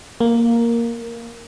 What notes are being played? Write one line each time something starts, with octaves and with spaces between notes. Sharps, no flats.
A#3